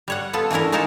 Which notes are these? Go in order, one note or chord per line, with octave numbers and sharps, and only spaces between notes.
G3 C#5 F#5
B3 F4 A4 B4
E3 A3 D4 E4 A#4
G#3 D#4 F4 A#4 C#5 A5